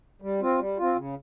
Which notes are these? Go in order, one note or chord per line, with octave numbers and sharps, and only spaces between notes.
G3
C4 F4
G3
C4 F4
C#3